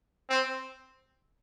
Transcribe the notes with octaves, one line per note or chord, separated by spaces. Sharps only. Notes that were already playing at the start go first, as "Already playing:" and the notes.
C4